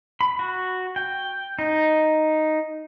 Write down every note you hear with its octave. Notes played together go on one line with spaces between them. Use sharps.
B5
F#4
G5
D#4